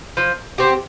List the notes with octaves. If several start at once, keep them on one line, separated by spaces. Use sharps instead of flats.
F3
C4 G4